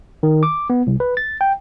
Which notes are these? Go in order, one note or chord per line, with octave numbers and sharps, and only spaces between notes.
D#3
D6
B3
C2
B4
A6
G5